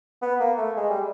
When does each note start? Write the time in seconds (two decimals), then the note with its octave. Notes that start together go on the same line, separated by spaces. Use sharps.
0.22 B3
0.40 A#3
0.58 A3
0.76 G#3
0.90 G3